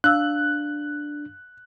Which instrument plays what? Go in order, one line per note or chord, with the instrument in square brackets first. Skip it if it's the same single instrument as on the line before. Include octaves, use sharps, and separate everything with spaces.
[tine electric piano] D4 [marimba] F5 E6 [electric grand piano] F#6